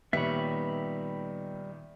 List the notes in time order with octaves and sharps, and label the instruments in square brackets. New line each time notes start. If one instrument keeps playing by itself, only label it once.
[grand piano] A#2 D#3 [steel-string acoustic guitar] G3 D#4 [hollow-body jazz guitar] B3 C#5 [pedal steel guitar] E5 B5